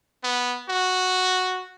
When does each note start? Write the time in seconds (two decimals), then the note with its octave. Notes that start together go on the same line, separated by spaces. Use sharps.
0.23 B3
0.69 F#4